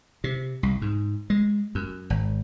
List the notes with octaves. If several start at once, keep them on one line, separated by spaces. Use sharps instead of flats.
C3
C2
G#2
G#3
F#2
G#1